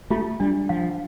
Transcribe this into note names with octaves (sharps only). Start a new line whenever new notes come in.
A3 F4
G3 D4
F3 F5